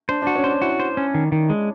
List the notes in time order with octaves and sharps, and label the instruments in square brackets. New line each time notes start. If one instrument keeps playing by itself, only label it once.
[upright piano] D4 [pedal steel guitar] C5
[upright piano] D4 [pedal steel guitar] F#4
[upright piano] C#4
[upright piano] D4 [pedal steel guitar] C5
[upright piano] E4 [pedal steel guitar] F#4
[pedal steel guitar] C5
C#4
D#3
D#3
G#3